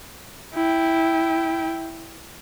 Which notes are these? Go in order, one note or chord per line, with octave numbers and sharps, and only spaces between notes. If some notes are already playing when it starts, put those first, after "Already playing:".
E4 G5